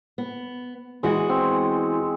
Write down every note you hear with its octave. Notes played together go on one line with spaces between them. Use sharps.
B3
E2 E3 G#3 F#4
C4